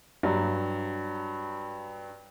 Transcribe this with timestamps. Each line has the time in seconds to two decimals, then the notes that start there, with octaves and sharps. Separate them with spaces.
0.23 G2 F#3